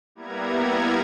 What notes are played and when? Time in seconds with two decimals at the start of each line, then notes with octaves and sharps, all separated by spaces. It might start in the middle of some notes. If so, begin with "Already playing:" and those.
0.15 G3 A#3 B3 E4 A#5 G#6